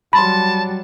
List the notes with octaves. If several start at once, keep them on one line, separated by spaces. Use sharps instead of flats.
F#3 G3 A5 B5 C6